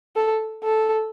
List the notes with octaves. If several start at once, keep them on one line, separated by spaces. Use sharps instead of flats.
A4
A4